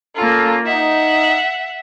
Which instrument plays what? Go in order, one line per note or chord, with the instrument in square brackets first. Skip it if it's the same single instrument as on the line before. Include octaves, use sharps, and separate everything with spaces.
[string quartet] A#3 F4 [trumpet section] C#4 A4 A#5
[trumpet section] D#4 [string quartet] E5 F#5